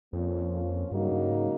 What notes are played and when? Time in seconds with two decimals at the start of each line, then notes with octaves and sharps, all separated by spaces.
0.13 F2 F3 A#3 C#4 F4
0.91 G2 C#3 F#3 A#3 D#4 F#4
1.12 G2
1.30 G#2